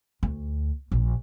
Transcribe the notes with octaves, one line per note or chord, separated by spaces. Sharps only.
D2
A#1